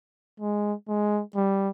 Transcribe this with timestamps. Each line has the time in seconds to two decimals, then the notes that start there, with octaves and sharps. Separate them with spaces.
0.40 G#3
0.88 G#3
1.35 G3